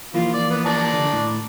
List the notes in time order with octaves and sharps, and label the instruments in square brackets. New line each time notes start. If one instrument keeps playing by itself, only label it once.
[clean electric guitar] E3 F3 A#3 [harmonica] F4
[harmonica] D5
B3
D5 A5 A#5
[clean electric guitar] D3
A2